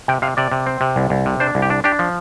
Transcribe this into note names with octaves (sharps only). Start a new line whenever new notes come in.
C3 G5
C3 F5
C3 D5
C3
C4
C3
C2
C2
C3
D4 C5
C2
G4
D4
D4 G4
F3